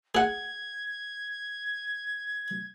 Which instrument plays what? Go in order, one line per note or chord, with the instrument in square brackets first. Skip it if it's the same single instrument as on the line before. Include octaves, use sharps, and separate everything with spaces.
[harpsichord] G#4 F#5 [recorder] G#6